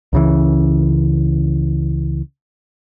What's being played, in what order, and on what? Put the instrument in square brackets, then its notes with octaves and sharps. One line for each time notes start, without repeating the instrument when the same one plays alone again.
[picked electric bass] C#2 C#3 E3